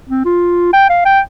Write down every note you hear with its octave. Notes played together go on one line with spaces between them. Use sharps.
C4
F4
G5
F5
G5